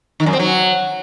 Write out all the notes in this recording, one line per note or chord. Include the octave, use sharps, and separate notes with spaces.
D#3
F#2
C4
F#3